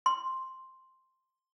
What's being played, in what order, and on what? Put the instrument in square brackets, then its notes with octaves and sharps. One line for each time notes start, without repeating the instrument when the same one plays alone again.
[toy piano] C6